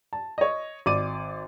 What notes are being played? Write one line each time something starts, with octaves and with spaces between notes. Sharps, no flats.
A5
C#5 D#5
G#1 D5 D6 D#7